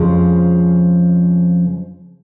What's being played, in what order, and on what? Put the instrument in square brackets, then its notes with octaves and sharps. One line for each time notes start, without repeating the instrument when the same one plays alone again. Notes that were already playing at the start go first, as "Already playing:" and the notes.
Already playing: [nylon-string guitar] F2 C#3 F3 G#3